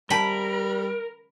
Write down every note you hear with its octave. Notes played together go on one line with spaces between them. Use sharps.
C3 G3 A#4 G5 A5 B5